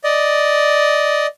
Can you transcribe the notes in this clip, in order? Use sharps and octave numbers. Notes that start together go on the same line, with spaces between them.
D5 D#5